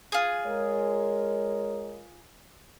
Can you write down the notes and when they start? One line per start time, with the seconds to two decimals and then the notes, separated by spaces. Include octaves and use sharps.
0.12 F4 G#4
0.46 G#3 A#4 C#5